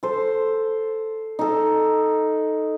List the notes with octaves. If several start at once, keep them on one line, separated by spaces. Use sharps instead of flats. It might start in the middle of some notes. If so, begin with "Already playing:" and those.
A4 C5
D#4 A4